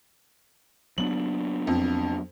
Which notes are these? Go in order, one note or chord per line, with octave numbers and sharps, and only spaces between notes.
F#3 B3 D4 F#7
F2